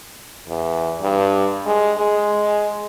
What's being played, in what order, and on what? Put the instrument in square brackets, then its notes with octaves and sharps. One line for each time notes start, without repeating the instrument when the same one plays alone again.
[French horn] E2
G2
G#3
G#3